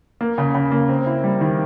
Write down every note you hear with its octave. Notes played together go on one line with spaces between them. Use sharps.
A#3
C#3
C#3
A#3
C4
E4
G3
D#3